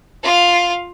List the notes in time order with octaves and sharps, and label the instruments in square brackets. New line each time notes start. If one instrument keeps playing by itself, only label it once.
[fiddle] F4 F5